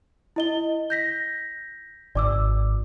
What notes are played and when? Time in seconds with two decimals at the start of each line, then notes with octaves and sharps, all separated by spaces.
0.36 E4 D#5 G7
0.90 G6 A#6 B6
2.15 G#1 D5 D6 E6